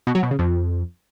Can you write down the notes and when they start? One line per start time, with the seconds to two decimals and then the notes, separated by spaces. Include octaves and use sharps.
0.07 B2
0.15 F#3
0.23 B2
0.31 C#3
0.39 F2